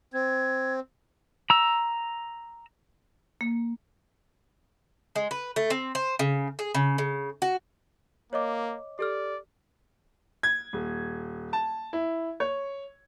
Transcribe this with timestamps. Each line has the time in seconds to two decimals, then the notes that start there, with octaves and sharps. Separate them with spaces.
0.13 C4 G#6
1.50 A#5 E6
3.41 A#3
5.16 G#3
5.31 B4
5.56 A3
5.70 C4
5.95 C5
6.19 C#3
6.59 G#4
6.74 C#3
6.98 C#3
7.42 F#4
8.33 A#3 C#5 D#5 D6
8.99 G4 A4 D5 F6
10.43 G#6
10.73 D#1
11.53 A5
11.93 E4
12.40 C#5